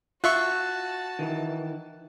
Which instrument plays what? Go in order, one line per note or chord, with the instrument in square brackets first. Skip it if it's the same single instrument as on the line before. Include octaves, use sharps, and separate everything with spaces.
[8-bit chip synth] F4 E5 C#6 [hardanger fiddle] F#4 A5 [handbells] F#6
[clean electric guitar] D#3 E3